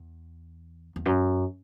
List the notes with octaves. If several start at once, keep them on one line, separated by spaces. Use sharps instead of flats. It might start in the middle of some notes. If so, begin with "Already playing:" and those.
Already playing: E2
E2
F#2